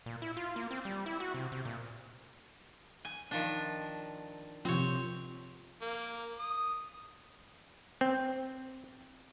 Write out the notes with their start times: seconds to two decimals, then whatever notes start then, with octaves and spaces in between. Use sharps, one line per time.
0.06 A#2
0.22 E4
0.37 F4
0.56 A#3
0.71 C4
0.85 G3
1.06 E4
1.20 F#4
1.34 C3
1.52 C3
1.65 A#2
3.05 G#5
3.31 D#3 F3 D4
4.65 C3 F3 C4 C#5
5.82 A#3
6.39 D#6
8.01 C4